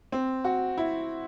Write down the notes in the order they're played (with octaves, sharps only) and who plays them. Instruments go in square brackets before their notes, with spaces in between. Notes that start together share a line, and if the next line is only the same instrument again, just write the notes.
[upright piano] C4
F#4
E4